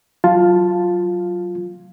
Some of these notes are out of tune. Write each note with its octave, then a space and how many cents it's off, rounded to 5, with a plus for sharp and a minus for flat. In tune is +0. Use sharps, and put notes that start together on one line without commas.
F#3 +10 F4 +5 A5 +0